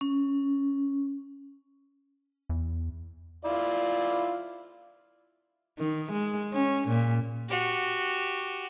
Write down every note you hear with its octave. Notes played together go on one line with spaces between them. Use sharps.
C#4
E2
E4 F4 D5
D#3
G#3
C#4
A#2
F#4 G4